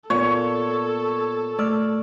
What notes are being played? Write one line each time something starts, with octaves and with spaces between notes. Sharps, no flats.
A#2 B3 A4 C#5
A3 D5 E6 F6